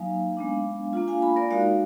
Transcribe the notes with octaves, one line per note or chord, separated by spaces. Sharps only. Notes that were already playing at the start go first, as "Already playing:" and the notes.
Already playing: F#3 A#3 D#4 F5 G#5
G#3 B3 D4
A#3 D4 F4
F5 G#5
G#5 B5
A#4 D5
G#3 D#4 F#4 D5 F5